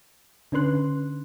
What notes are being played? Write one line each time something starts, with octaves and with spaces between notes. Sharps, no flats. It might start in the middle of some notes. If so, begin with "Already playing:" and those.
D3 C#4 D4 B4 C6 F#6